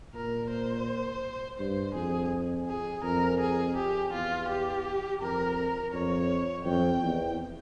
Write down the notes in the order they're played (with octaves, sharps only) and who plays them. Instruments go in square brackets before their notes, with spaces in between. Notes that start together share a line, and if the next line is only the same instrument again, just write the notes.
[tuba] A#2 [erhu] A#4
[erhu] C5
[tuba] G2 [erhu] C5
[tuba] F2 [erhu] G#4
[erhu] G#4
[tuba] F2 [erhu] A#4
[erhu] G#4
G4
[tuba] E2 [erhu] F4
[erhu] G4
[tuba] F2 [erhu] A#4
[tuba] F2 [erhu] C#5
[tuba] F2 [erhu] G5
[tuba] E2